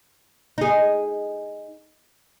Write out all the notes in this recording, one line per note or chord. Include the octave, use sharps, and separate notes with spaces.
D#4 G#4